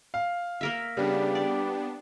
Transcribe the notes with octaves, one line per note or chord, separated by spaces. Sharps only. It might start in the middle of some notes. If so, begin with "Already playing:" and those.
F5
A#3 A#4 E5
C#3 G3 B3 D4 G4
D5